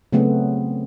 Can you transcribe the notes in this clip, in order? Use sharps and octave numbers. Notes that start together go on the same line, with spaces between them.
C#3 F#3 A3 B3 C4